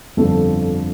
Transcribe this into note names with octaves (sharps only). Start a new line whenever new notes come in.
G1 F2 D3 F3 A4